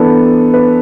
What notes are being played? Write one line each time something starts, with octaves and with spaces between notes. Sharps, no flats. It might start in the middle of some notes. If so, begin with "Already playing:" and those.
Already playing: E3 B3 D4 A4
B4